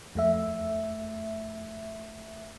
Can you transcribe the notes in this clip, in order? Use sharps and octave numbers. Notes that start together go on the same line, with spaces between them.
F2 A3 E5